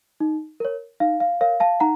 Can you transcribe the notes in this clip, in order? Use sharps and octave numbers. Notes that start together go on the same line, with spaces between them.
D#4
A#4 C#5
D#4 F5
F5
A#4 C#5 F5
F5 A5
D#4 F#5 A#5